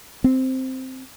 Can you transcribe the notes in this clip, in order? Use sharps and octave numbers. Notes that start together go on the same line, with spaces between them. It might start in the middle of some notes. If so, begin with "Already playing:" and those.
C4